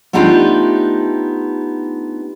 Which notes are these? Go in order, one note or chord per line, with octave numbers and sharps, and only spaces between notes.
A3 B3 D4 D#4 F4 G4